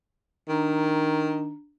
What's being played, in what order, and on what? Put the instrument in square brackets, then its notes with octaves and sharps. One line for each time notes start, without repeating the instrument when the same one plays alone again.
[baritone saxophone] D#3 [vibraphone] D4 A#5